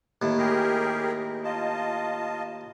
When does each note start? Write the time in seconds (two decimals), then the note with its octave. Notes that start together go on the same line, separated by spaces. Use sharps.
0.22 D#2 A2
0.38 G4 G#4 A#4
1.44 F4 D#5 A5